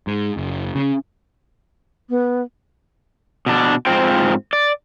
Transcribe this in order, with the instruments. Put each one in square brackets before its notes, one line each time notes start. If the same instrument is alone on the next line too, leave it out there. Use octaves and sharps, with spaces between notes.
[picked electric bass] G#2
F#1
C#3
[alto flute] B3
[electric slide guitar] B2 D4
G#2 C4 F4 C5 G5
D5